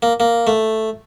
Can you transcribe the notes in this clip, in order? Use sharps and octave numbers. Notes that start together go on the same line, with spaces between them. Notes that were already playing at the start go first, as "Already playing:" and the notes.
A#3
A#3
A3